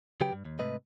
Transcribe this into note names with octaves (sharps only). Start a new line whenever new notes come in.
C#3 F#3 G4 B4 G5
G2
D#2
G#2 C3 A3 B4 D#5